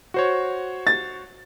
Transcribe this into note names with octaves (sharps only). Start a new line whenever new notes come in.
F#4 C5 C#5
A6